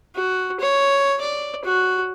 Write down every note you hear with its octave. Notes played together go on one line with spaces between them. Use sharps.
F#4
C#5
D5
F#4